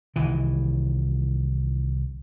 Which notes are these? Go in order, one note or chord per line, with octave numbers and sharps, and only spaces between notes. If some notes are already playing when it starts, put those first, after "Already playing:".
C2 D#3 E3